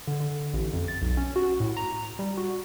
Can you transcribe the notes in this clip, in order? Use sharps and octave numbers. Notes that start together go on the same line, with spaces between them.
D3
D3
A1
F2
A6
B1
C#4
F#4
A2
A#5
G3
F#4